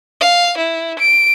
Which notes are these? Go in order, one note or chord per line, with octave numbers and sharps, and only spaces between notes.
F5
E4
D7